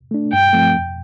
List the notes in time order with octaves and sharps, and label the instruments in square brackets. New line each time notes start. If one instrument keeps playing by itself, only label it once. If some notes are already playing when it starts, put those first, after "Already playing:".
[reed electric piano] A3 D4
[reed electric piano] G2 [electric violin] G5
[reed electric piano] F3 A3 C4
F2